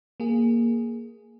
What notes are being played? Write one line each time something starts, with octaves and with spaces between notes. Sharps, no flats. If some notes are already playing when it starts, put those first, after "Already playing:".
A#3 G#4